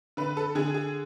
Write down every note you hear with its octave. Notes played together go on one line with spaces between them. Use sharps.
D3 B4
A4
D3 G#4
G#4